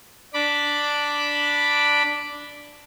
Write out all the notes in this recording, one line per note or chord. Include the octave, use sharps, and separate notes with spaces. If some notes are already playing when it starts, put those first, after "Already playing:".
D4 B5 D6